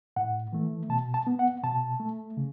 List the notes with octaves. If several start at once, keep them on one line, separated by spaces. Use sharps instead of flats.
A2 F#5
E3 A3
B2 A5
A5
B3
F#5
B2 A5
A3
C#3